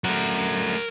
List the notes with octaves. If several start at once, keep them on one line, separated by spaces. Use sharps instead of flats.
F#3 A3 A#4 F#5